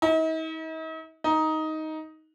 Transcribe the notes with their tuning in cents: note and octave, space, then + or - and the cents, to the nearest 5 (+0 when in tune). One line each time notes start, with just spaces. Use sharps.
D#4 +45
D#4 +10